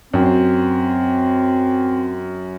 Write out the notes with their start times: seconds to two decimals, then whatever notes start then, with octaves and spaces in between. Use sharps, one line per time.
0.14 F#2 C4